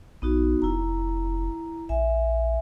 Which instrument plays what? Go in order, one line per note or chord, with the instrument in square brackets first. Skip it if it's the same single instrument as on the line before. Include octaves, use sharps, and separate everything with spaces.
[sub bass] A#1 [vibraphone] B3 D#4 F#4
[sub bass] F1 [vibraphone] E4 A#5
[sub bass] A#1 [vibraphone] E5 G#5